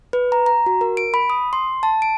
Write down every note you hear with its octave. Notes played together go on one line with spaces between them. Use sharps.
B4
A#5
A#5
F#4
A#4
D7
B5
D#6
C6
A5
D7